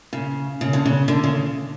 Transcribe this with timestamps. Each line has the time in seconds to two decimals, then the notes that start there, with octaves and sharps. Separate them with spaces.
0.13 C#3
0.61 C#3
0.73 D3
0.85 C#3
1.08 D3
1.24 C#3